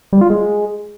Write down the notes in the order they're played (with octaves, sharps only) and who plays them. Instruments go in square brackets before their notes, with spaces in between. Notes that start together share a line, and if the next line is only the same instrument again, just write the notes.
[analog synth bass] G3
F4
G#3